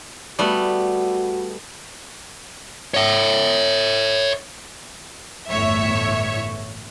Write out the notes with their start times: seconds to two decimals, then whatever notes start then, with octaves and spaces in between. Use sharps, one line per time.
0.39 G3 A3 B3 F#4
2.94 C#5 E5
5.50 G1 E2 A2 C#5 E5